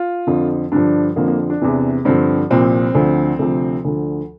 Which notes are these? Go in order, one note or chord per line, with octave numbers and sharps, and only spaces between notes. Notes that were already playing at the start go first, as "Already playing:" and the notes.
Already playing: F4
F2 D3 F3
G2 D3 F3 D4
F2 D3 F3 A#3
A#3
D4
E2 C3 E3
G2 D3 F3 C4
C2 A#2 F3 C4
D2 D3 F3
D2 C3 F3
D2 D3 F3